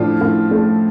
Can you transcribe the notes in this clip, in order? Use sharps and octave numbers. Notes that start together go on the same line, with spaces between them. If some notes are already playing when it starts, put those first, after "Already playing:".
Already playing: A2 F3 D4 F4
A2
A3